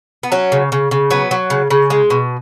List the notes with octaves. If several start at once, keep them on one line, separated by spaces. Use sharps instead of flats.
B3
F#3 C#4
C#3
C#3
C#3
F#3 B3
F#3
C#3
C#3
G#3
B2